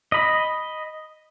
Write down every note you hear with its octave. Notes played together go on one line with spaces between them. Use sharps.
D#5 B5